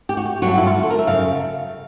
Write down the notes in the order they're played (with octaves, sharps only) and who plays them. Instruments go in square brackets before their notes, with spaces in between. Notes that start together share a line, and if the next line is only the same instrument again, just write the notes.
[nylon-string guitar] G4
F#4
G4
G2 D3 F#3 F#4
E4
F4
F#4
A4
A#4
E5
F#2 C#3 F5